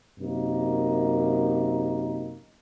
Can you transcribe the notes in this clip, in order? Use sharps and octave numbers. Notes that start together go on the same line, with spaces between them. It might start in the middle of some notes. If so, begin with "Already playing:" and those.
F#2 C3 A#3 D#4